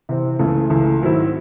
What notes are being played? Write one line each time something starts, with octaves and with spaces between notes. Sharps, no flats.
C3 E3 C4
C#2 C#3 E3 A3
C#2 C#3 E3 A3
G#2 D#3 F#3 C4 E4